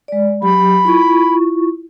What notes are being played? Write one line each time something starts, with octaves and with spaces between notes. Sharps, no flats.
G#3 D5
F#3 G4 B5
E4 F4 C#6